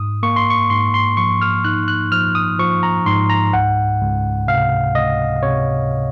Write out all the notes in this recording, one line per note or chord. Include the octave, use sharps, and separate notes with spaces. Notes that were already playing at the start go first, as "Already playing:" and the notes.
Already playing: G#2 D#6
A#3 C#6
C6
C#6
G#2 C6
C6
F3 C#6
F6
D#4 F#6
F#6
F3 F6
D#6
F3 C#6
A#5
G#2 C6
A#5
C#2 F#5
C#2
C3 F5
C#2 D#5
C3 C#5